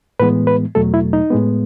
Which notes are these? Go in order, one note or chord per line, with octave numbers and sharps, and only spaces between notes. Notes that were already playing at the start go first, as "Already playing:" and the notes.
A2 E3 G#3 B3 B4
B4
E2 B2 F#3 A3 A4
E4
D#4
A2 G#3 B3